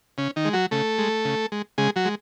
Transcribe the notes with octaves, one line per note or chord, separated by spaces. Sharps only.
C#3 C#4
D#3 D#4
G#3
F#3 F#4
C#3 A3 A4
G#3
C#3
G#3
C#3 G#3 G#4
F#3 F#4
G#3